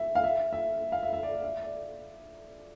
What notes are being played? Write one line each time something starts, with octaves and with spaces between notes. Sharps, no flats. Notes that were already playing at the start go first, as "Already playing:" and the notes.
Already playing: E5
F5
E5
E5
F5
E5
E5
D5
E5
D5